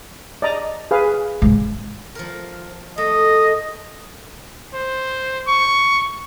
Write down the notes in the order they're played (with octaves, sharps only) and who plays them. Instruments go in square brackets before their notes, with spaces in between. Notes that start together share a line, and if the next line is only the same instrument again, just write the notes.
[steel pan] D5 D#5 A#5
G#4 B4 F5
[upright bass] G#2 C#3
[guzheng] F3 A#4
[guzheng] A3 [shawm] D#5
[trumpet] C5
C#6